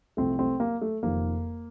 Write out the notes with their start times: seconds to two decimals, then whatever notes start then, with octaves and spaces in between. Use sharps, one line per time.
0.17 C2 C3 F3 A3 C4
0.39 A3 C4
0.60 A#3
0.82 A3
1.03 F1 F2 D#3 A#3